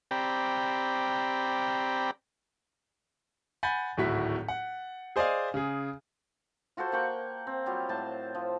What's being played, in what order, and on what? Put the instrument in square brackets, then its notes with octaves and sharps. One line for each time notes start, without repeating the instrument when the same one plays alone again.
[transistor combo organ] C4 G4 D5 G5 A#5 B5
[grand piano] F#5 G#5 B5 G6 A6
D1 G#1 A2 E4 F#4 B6
F#5
G#4 C5 D5 D#5 F5 G#5
C#3 G#4
[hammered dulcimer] F4 F#4 A4 C5
A#3 F#5 G5 C#6
C4
F#3 G3 F4
A2 C5 A5
F3